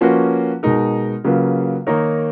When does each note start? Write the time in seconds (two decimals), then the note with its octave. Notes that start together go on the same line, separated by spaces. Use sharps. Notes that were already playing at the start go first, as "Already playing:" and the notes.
0.01 F3 A#3 C#4 F#4 B4
0.63 B2 G#3 D#4 A#4
1.24 C#3 F#3 A#3 F4 B4
1.87 D#3 A#3 D#4 A#4 C#5